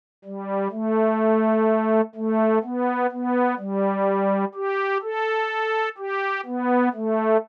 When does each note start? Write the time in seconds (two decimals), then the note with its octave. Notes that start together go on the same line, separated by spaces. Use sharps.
0.25 G3
0.72 A3
2.15 A3
2.63 B3
3.11 B3
3.59 G3
4.55 G4
5.03 A4
5.98 G4
6.46 B3
6.94 A3